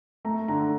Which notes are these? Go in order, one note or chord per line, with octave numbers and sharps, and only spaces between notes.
A3 A#5
D3 A#5